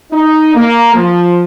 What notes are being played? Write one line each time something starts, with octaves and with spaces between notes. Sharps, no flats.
D#4
A#3
F3